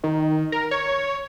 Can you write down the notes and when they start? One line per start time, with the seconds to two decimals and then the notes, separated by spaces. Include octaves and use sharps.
0.04 D#3
0.52 A#4
0.71 C#5